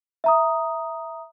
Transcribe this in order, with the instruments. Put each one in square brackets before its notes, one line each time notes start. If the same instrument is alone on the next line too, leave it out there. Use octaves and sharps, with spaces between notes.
[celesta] E5 A#5 D#6